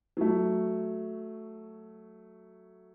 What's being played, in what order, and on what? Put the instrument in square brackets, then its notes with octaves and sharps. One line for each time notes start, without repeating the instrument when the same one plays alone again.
[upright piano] F#3 A3